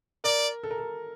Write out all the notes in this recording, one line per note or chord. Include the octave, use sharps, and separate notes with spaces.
A#4 D5
A4
A#4
A4